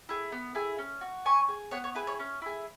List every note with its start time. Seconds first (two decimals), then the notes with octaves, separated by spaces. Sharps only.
0.09 E4 G#4
0.32 B3
0.55 E4 G#4
0.78 C#4
1.01 F#4
1.25 C#4 G#5 C#6
1.48 G#4
1.71 B3 C#5 F#5
1.84 C#5
1.95 E4 G#4 B4
2.07 C#5
2.19 C#4
2.42 E4 G#4